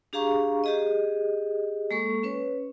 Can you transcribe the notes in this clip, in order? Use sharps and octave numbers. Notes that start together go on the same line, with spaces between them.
D4 G4 G#4 F5 A#5 C#6
G4 G#4 D#5
G#3 A#3 A4 C#6
C#4 B4 C#5